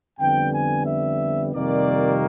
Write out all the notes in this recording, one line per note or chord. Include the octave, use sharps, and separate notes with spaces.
F2 D3 G3 B3 G5
G#5
E5
F2 C3 D#3 G3 A#3 D5